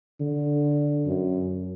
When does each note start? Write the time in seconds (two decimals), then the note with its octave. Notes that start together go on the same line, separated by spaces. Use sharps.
0.20 D3
1.07 F#2